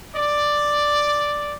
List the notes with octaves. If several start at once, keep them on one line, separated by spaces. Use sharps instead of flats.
D5